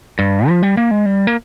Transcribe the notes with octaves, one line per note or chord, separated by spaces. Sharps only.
G2
F3
G3
A#3
G#3
G3
A#3